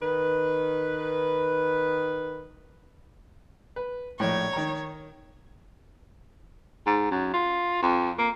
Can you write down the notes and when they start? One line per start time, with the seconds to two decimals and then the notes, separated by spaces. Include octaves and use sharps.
0.01 D#3 B4
3.76 B4
4.20 A#1 A2 C#5
4.53 D#3 A#5
6.86 G#2
7.11 F#2
7.34 F4
7.82 F2
8.19 A#3